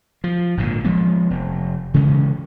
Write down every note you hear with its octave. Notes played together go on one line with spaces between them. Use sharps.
F3
G#1 A#2 D3
F3 G#3 B3
F1
C#3 E3 G#3 C#4